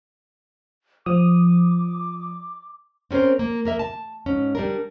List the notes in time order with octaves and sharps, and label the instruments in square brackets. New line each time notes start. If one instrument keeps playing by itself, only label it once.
[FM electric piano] F3 D#6 [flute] D6
[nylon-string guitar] C4 C#4 G#4 A#4 C5
A#3
A#3 A#4 E5
A5
G#2 C#4
G3 D4 A#4